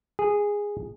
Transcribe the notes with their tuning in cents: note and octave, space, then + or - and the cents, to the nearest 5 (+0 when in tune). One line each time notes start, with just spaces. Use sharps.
G#4 -10